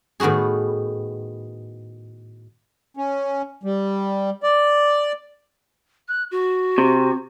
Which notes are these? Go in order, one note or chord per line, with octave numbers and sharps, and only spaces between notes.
A2 D#3 B3 F#4 G#4
C#4
G3
D5
F#6
F#4
C3